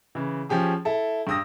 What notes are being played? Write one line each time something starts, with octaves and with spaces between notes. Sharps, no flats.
C#3 E3
F3 C#4 G4 G#4
E4 A4
G2 G4 D#6 E6 A#6